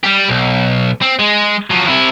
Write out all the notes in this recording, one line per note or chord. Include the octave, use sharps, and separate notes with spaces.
G3 G4
B1
C4
G#3
F3 F#3
C3 E4